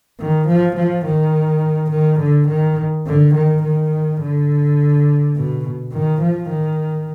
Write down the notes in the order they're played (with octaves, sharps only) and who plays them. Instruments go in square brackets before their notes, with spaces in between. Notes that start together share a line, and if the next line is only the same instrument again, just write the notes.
[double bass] D#3
F3
F3
D#3
D#3
D3
D#3
D3
D#3
D#3
D3
B2
D#3
F3
D#3